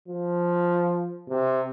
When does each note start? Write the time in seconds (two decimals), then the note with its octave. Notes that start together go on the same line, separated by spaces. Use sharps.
0.08 F3
1.29 C3